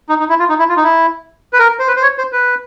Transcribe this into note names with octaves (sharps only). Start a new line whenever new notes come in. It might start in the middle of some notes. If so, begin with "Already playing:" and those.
D#4
D#4
E4
F4
D#4
E4
F4
D#4
E4
B4
A#4
C5
B4
C5
C#5
C5
B4